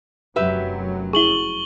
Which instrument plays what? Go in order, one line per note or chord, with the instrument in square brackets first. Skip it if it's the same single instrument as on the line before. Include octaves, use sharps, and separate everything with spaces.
[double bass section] F1 F#2 F#3 [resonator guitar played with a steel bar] G4 B4 E5
[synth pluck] E4 G#4 [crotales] C#6 F#7 G7